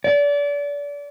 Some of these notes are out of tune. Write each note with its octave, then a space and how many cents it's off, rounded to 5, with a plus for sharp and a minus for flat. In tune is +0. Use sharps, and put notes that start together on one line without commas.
D5 -30